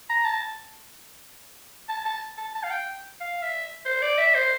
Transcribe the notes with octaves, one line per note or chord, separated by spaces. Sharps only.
A#5
A5
A5
A5
A5
A5
F5
G5
F5
E5
C5
D5
E5
C5